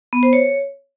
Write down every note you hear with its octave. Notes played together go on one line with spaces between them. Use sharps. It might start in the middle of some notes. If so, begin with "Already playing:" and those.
B3
C5
C#5